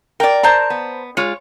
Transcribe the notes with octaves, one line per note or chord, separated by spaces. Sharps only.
A#4 D5 G5 D6
C5 A5 A#5
B3
G#3 F4 C#5